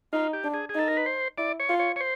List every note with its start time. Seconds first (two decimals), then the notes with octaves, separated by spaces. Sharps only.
0.13 D#4 F4
0.33 G4
0.44 D4
0.54 G#4
0.69 G#4
0.75 D#4 A4
0.88 A#4
0.97 B4
1.06 C5
1.38 E4 D5
1.60 C#5
1.69 F4
1.79 C#5
1.96 C#5
2.00 C5